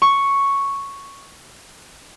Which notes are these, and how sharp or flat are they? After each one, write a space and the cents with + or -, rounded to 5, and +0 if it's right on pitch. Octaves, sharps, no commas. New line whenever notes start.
C#6 +0